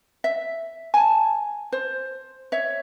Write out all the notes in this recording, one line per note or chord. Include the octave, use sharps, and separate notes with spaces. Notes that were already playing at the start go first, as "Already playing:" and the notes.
E5
G#5 A5
C5
C#5 E5